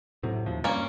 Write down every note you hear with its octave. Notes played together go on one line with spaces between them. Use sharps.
A2 C3 F#3
D#2 C3 F3
G2 A#3 C#4